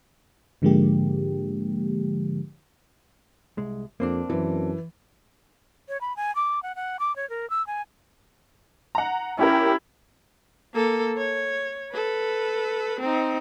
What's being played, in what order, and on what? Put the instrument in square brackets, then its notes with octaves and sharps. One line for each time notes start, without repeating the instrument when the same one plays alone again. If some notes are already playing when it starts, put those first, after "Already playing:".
[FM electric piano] G#2 D3 F3 G#3 A#3 G4
[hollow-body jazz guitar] C2 G#3
[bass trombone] F2 [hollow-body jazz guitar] A#3 C4 D4
[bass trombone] F#2 [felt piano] E3
[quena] C#5
B5
G#5
D6
F#5
F#5
D6
C#5
A#4
E6
G#5
[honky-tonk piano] F#5 A#5
[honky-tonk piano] C#4 G4 A#4 [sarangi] E4
[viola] A#3 A4
C#5
A4 B4
C4 D#4